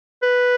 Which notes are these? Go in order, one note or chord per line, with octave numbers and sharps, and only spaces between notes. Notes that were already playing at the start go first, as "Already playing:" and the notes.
B4